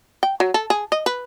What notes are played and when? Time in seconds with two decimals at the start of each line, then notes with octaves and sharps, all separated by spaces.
0.23 G5
0.40 F#3
0.54 A4
0.70 G#4
0.92 D#5
1.06 B4